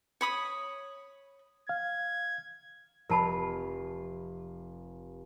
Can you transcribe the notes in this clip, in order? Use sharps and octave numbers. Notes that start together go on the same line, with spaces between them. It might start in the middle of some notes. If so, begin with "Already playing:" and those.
C#5 B5 D#6
F5 G#6
F1 A#4 A5 B5 C7